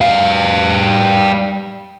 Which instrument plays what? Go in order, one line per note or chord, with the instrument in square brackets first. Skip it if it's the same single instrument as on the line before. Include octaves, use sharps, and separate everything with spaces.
[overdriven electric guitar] G3 F5